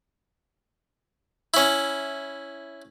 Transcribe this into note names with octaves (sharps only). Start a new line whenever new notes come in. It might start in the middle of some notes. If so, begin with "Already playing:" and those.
C#4 E4